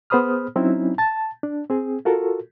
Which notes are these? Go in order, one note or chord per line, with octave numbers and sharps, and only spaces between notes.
B3 G#4 C5 B5 D#6 F6
F#3 C4 C#4 D#4 E4
A5 A6
D4
C4 G#4
F4 F#4 A4 A#4